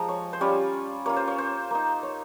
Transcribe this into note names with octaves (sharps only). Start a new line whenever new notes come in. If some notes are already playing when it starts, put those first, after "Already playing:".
Already playing: F3 G#3 A#5
C#5
C5
G3 C#4 F4 C#5
A#3 C#4 F4 C#5
C5
C#5
C5
A#3 D#4
C#5